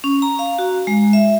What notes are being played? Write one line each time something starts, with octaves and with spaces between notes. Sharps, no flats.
C#4
A#5
F5
F#4
G#3
E5